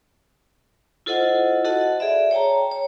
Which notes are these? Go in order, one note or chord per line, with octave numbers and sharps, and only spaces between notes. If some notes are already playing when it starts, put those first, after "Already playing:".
E4 F4 A4 C5 D#5 F#5
F#4 A4 D#5 F#5 A5
G#4 D5 E5
C#5 G5 A5 A#5
C#5